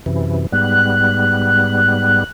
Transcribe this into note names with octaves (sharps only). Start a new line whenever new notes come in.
F#2 C3 E3
G#2 G3 B3 F#6